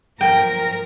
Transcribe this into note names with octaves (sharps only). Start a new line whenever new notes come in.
F3 A#4 G5